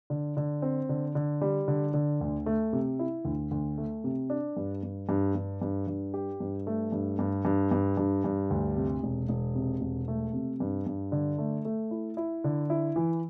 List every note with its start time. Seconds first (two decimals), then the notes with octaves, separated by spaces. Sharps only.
0.10 D3
0.37 D3
0.62 C4
0.89 D3
1.15 D3
1.41 G3
1.68 D3
1.94 D3
2.21 D2
2.46 A3
2.73 C3
2.99 E4
3.25 D2
3.51 D2
3.78 A3
4.04 C3
4.30 D4
4.57 G2
4.83 G2
5.09 G2
5.35 G2
5.62 G2
5.87 G2
6.14 G4
6.40 G2
6.67 A3
6.92 G2
7.19 G2
7.45 G2
7.71 G2
7.97 G2
8.24 G2
8.50 D2
8.76 C3
9.03 E1
9.29 E1
9.55 C3
9.81 E1
10.08 A3
10.33 C3
10.60 G2
10.87 G2
11.12 D3
11.38 A3
11.65 A3
11.91 E4
12.17 E4
12.44 D3
12.70 E4
12.96 E3